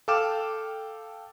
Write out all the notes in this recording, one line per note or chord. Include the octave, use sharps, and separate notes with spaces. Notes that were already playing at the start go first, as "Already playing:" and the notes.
A4 F5 G5 D6 F6 E7